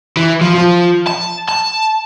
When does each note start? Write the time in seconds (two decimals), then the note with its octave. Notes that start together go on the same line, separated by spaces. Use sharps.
0.17 E3
0.42 F3
0.55 F3
1.07 A5
1.48 A5